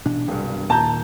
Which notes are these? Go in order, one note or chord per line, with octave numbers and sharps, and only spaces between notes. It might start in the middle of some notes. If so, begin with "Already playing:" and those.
A1 B2 D4
E1 C2 G2
D#2 A#2 A5 A#5 G6